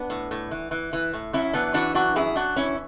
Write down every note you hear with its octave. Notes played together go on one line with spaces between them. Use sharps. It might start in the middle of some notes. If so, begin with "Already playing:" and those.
Already playing: B3 D4
A2
A2
E3
E3
E3
A2
F#2 C#4 E4
E3 B3 D4
E3 D4 F#4
F#2 D4 F#4
F#2 E4 G#4
F#2 D4 F#4
E3 C#4 E4